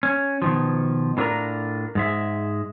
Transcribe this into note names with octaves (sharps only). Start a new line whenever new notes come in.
C#4
B2 D#3 F3
A2 B3 D4 F4 A#4 A#5
G#2 G#3 E5